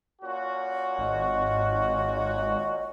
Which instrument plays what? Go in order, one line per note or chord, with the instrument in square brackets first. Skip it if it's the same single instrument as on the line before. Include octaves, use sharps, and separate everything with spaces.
[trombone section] A#2 C#4 F#4
[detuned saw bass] G#1 [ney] D#5